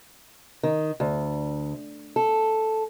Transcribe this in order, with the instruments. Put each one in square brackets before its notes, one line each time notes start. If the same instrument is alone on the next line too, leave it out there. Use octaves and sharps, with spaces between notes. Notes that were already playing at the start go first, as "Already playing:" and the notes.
[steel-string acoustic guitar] D#3
D2
A4